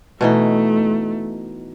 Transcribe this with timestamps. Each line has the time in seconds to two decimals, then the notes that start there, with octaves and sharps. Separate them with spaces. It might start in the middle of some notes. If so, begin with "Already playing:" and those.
0.21 B2 E3 A3 D#4